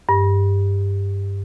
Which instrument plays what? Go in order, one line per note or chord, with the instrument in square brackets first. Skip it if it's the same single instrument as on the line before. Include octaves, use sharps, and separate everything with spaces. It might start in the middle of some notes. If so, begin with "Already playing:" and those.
[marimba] G2